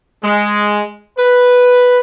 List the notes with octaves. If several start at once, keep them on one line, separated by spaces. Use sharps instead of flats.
G#3
B4